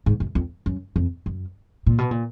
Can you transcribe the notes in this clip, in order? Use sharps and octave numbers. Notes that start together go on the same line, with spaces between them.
G#2
F#2
F2
F#2
F2
F#2
A#2
B2
A#2